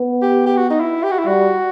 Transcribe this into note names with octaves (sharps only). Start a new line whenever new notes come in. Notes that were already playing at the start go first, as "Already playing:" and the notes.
Already playing: B3
G4
G4
F#4
D#4
E4
G4
F#4
E4
G3 F#4